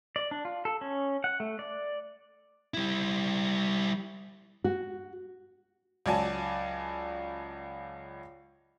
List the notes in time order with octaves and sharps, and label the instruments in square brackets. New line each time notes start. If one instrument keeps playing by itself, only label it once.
[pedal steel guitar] D5
D4
F4
A4
C#4
F#5
A3
D5
[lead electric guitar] G3 E4
[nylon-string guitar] F#4
[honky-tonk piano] C#2 F#3 D5 G#5 A5